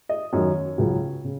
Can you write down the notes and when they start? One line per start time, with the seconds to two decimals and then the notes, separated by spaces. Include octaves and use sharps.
0.09 D#5
0.33 F#2 D#3 F#3 C#5
0.78 C#2 C#3 F#3
1.24 C#3